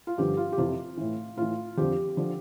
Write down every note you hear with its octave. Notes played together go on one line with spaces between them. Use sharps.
F4
G2 D3 F3 G4
F4
G4
F2 C3 E3 F4
A2 E3
A2 E3 F4
F2 D3 F3 G4
D3 F3